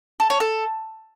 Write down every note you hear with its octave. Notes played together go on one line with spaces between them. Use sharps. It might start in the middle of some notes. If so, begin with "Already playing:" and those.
A4
C#5
A4